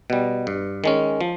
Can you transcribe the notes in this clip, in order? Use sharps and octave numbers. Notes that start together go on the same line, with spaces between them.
B2 G3
G2
D#3 G#3 C#4
F3